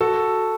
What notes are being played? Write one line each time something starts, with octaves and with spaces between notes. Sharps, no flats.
F#4 A4